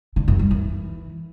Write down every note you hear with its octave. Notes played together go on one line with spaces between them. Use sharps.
D3
F#2
G3
E3